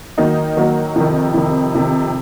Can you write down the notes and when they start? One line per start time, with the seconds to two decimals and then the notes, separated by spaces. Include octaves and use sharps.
0.18 D#3 F#3 A#3 D#4
0.57 D#3 F#3 A#3 D#4
0.96 F2 C3 D#3
1.34 F2 C3 D#3
1.74 F2 C3 D#3